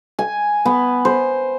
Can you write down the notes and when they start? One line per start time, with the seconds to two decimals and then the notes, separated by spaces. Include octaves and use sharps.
0.19 G#5
0.65 B3
1.05 C5